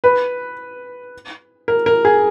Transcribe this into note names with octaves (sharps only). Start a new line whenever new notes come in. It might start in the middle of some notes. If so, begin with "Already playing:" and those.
B4
A#4
A#4
G#4